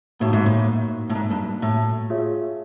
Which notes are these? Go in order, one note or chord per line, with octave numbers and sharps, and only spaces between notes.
A2 A#3 D#4 F#4
G#2
A2
A2
G#2
G2
A2
F4 G#4 C#5 E5